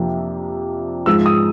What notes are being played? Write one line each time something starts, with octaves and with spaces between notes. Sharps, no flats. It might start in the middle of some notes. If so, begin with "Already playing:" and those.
Already playing: F2 C3 F3 A#3 D4
G#2 F3 G#3 E6
D#6